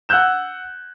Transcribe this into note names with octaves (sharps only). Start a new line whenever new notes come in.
F#5 E6 F#6 G6 E7